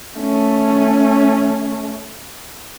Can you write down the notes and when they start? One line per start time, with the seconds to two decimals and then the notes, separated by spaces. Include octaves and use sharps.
0.17 A3 C#4